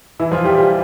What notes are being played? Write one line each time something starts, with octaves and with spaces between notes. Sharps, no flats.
E3 E4
F3 F4
G3 G4
G3 G4